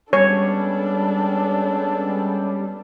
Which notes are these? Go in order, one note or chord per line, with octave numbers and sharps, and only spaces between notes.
G3 G#3 B3 C#4 D4 A4 C#5